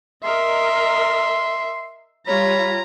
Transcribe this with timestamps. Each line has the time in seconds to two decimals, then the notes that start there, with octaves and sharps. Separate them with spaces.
0.24 A#4 D#5 E5 C6
2.27 G3 F4 C#5 A#5 B5